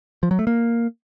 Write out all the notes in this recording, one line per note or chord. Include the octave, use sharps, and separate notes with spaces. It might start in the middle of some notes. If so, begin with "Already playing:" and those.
F3
F#3
A3
A#3